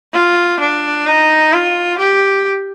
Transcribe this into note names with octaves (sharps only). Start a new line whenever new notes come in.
F4
D4
D#4
F4
G4